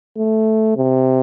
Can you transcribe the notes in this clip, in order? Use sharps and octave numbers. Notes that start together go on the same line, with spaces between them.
A3
C3